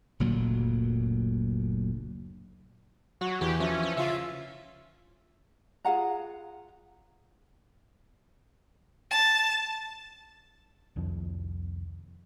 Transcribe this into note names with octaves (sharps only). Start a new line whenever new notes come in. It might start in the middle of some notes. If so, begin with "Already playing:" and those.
F#1 D2 A#2 F#3
F#3 F#4
E2 E3 G4
E3 F3 C#4
C#4
C#3 F4 E5
F4 G#4 F#5 A#5
A5
C2 F2 D#3 F3